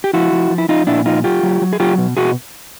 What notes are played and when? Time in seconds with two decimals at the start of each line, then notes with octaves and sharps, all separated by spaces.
0.04 G4
0.13 F3 E4 F#4
0.32 F3
0.50 F3
0.58 E4
0.68 F3 D#4 F4
0.87 A#2 D4 E4
1.06 F3 D#4 F4
1.24 F#3 F4 G4
1.43 F#3
1.61 F#3
1.73 G#4
1.80 F#3 F4 G4
1.98 B2
2.17 B2 F#4 G#4